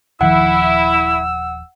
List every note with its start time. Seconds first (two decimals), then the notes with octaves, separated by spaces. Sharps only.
0.21 D#1 D#3 F3 E4 F#5 E6